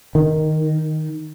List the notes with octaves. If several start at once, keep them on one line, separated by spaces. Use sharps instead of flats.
D#3